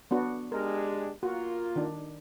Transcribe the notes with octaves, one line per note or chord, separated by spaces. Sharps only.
B3 D4 F#4
G#3 D4 G4 A#4
A#3 F4 F#4
D#3 D4